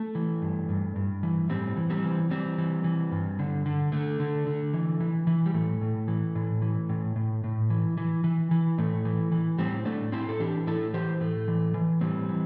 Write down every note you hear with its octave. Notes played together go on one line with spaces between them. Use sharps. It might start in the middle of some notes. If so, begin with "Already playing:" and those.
Already playing: A3
E3
G2
G2
G2
E3
A2 G3 C4
E3
G3 C4
E3
E3 G3 C4
E3
E3
G2
D3
D3
D3 A3
D3
D3
E3
E3
E3
G3
A2 A3
A2
E3
A2
E3
A2
A2
A2
E3
E3
E3
E3
A2 A3
E3
E3
A2 G3 C4
A2 A3 D4
A2 C4 E4
A4
E3 D4 G4
A2 E4 A4
E3 G4 C5
A2 A3
E3
E3
A2 G3 C4
E3